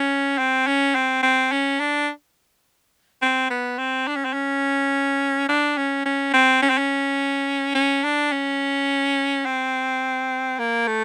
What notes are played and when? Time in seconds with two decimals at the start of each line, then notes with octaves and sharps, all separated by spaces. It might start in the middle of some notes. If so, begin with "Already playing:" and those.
Already playing: C#4
0.38 C4
0.67 C#4
0.95 C4
1.23 C4
1.52 C#4
1.80 D4
3.22 C4
3.50 B3
3.78 C4
4.07 D4
4.16 C#4
4.25 C4
4.33 C#4
5.49 D4
5.77 C#4
6.05 C#4
6.34 C4
6.62 C#4
6.70 C4
6.78 C#4
7.75 C#4
8.04 D4
8.32 C#4
9.45 C4
10.59 A#3
10.87 A3